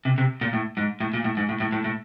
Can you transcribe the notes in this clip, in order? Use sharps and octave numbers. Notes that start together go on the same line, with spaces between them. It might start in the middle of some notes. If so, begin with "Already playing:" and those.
C3
C3
A#2
A2
G#2
A2
A#2
A2
G#2
A2
A2
A2
A2